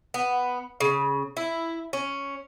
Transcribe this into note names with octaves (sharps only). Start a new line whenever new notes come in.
B3
C#3
E4
C#4